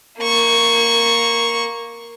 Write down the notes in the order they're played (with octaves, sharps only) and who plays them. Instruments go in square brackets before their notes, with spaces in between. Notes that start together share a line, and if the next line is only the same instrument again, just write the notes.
[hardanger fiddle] A#3 C#6